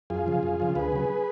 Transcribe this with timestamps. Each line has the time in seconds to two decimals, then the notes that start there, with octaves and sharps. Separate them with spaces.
0.10 F#2 F4 G#4
0.26 C#3 F3
0.43 F#2
0.60 C#3 F3
0.75 D2 G#4 B4
0.92 C#3 F#3